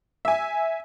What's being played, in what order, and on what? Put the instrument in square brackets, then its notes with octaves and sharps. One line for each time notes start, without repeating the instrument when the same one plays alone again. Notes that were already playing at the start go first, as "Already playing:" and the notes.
[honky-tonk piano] E5 G#5